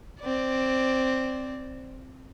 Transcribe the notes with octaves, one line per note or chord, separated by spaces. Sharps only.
C4 D5